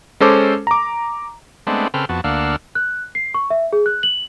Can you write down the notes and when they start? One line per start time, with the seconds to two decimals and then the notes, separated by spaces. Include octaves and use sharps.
0.20 G#3 C#4 A4 C5 D6
0.67 A#5 D6
1.67 G#3 A3 B3 C4 D4
1.94 C#3 C4 A4 B4 G5 F6
2.09 F2 B3 F#4 A5
2.24 D2 A#3 D4 F5 F#5 E6
2.75 F#6
3.15 C7
3.34 C#6
3.50 E5
3.73 G#4
3.86 F#6
4.03 F#7